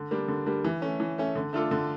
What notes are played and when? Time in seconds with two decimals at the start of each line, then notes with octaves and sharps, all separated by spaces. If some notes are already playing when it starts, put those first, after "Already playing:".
Already playing: D3
0.11 G3 A#3 D4
0.28 D3
0.46 G3 A#3 D4
0.64 E3
0.82 A3 C#4
1.00 E3
1.18 A3 C#4
1.36 D3
1.53 A3 D4 F4 A4
1.71 D3